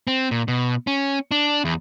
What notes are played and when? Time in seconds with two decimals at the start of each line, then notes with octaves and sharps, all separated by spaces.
0.07 C4
0.31 A#2
0.48 B2
0.87 C#4
1.31 D4
1.65 E2